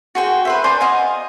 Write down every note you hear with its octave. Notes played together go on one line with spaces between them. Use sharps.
F#4 G#4 C5 G5
B4 C5 E5
C5 D5 G#5 A#5
D#5 F5 F#5 G#5